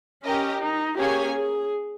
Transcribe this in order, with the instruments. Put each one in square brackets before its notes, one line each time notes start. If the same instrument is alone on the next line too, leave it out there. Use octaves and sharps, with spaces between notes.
[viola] C#4 [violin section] G4 A#4 D#5
[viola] D#4
[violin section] A#3 C#4 G#4 C#5 G#5 [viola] G4
[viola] G#4